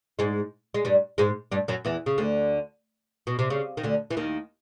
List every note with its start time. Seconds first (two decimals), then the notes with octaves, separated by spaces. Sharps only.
0.19 G#2 G#3
0.74 G#3
0.85 G2 G3
1.18 G#2 G#3
1.52 G2 G3
1.68 F#2 F#3
1.85 E2 E3
2.06 C#3
2.18 D2 D3
3.27 B2
3.39 C3
3.50 C#3
3.77 D#3
3.83 D2 D3
4.11 E3
4.17 D#2 D#3